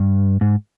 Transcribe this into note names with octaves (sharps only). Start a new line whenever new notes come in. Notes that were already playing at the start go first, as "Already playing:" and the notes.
Already playing: G2
G#2